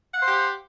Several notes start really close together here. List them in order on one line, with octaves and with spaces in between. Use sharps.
F#5 F5 C5 G4